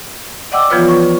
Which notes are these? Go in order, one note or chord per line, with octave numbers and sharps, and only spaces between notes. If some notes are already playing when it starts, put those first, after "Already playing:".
D5 D#5 F#5 G5 D6 E6
E3 F3 B3 F4 B4 C#5
C#6